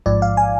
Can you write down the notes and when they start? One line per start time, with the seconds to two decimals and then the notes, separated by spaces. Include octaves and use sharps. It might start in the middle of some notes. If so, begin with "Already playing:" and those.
0.06 A1 G#2 F3 D5
0.22 F5
0.37 G#5